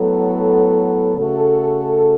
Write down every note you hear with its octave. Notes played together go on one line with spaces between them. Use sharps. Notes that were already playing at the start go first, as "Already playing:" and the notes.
Already playing: A2 F#3 B3 A4
C#3 A3 F#4 A4